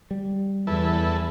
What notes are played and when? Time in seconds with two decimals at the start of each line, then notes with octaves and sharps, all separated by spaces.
0.11 G3
0.67 E2 E4 A4 B4